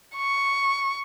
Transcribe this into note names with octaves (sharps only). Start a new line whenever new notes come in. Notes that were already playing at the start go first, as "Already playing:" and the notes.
C#6